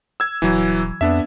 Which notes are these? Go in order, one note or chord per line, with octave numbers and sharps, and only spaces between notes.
E6 G#6
D#1 E3 F#3
F2 B3 D4 E5